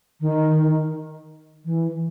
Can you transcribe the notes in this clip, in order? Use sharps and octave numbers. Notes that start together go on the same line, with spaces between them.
D#3
E3